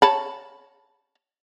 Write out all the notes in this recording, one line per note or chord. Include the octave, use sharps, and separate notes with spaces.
C#5 A5 B5